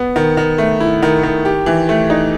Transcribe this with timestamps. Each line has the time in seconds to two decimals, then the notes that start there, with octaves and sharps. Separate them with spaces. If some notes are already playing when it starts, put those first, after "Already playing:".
Already playing: B3
0.16 D#3
0.37 D#3
0.58 A3
0.80 E4
1.02 D#3
1.23 D#3
1.45 G4
1.66 E3
1.89 A3
2.10 D#4